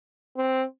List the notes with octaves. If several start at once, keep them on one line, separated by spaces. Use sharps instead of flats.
C4